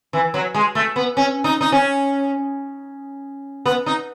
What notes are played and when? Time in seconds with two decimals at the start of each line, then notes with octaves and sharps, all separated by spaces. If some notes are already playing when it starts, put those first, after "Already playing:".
0.13 E3
0.34 F#3
0.54 G#3
0.75 A3
0.96 B3
1.17 C#4
1.44 D#4
1.61 D#4
1.72 C#4
3.66 B3
3.86 D#4